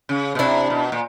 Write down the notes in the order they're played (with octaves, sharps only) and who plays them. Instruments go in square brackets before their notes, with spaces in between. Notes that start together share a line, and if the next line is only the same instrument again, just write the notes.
[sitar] C#3
B2
[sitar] C3 [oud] D4 E4
[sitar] B2
A#2